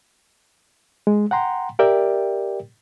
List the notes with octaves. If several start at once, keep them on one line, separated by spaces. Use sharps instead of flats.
G#3
F#5 G5 A#5 C6
G4 A#4 D5 E5 G5